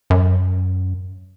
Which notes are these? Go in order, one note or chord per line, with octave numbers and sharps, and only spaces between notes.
F#2